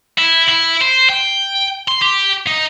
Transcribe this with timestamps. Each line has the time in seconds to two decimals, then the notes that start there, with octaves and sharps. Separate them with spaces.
0.19 E4
0.50 E4
0.82 C5
1.10 G5
1.88 C6
2.02 G4
2.47 D#4